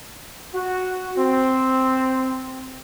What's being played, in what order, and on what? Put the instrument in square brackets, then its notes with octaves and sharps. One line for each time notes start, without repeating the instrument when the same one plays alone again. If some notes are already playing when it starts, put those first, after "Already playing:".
[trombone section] F#4
C4